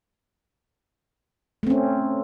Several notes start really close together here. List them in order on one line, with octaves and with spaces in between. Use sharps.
A3 C4 C#4